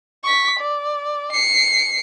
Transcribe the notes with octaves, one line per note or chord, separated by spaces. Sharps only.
C#6 B6
D5
C7 C#7